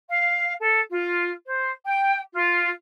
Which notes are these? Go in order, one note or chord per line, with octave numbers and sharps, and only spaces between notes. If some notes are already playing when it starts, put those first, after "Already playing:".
F5
A4
F4
C5
G5
F4